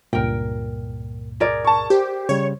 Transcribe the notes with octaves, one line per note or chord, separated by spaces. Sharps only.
C#2 G2 A#2 A#4 G5
G#4 A#4 D5
A5 C#6
G4 C5
C#3 G3 C#5